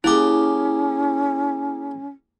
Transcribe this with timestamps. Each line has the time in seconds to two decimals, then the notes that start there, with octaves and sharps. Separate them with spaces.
0.04 A#3 C#4 E4 G4 G#4 D6